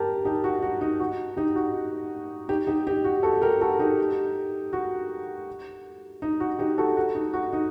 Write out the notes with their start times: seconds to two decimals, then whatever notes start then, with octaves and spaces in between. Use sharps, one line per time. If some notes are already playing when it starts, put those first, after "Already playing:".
Already playing: G4 A#4 A5
0.25 D#4 G4
0.44 F#4
0.62 F#4
0.81 D#4
1.00 F#4
1.36 D#4 G4
1.56 F#4
2.49 D#4 G4
2.67 D#4 G4
2.87 D#4 G4
3.04 F#4
3.23 F#4 A4
3.42 G4 A#4
3.61 F#4 A4
3.79 D#4 G4
4.73 F#4
6.22 D#4
6.40 F#4
6.59 D#4 G4
6.78 F#4 A4
6.97 F#4
7.15 D#4
7.33 F#4
7.53 D#4